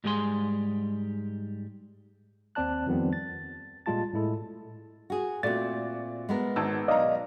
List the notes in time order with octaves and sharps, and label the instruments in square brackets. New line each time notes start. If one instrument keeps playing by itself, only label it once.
[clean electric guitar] G#2 G3 G#3 G#4 G#5 C6
[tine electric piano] D#2 C4 D5 A5 F#6
F2 D#3 F3 G3 B3 C4
A6
A#2 G3 G#3 F4 A5 A6
A2 G#3 E4 A4
[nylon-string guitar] F#4 G#4
[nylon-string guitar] A#2 C4 [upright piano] A3 F#4 D5 [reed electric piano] A6
[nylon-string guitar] G#3 B3 A#4
[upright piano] G#1 A5 E6
[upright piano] B1 A#5 [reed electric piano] D5 D#5 F5